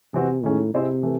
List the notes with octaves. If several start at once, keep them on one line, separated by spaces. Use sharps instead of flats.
C3 E3 C4 F#4
A2 D#3 G#3 C#4
C3 C4 E4 G#4 C5 D#5
E3 A3